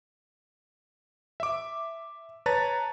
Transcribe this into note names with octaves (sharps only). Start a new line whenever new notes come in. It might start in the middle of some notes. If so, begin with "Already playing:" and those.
E5 D6
B4 C#5 A5 A#5 A6